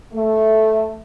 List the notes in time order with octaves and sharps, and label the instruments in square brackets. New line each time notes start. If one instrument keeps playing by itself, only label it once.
[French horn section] A3